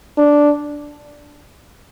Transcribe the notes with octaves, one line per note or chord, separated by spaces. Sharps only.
D4